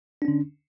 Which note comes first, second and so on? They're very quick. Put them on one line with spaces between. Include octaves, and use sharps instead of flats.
D4 C#4 D3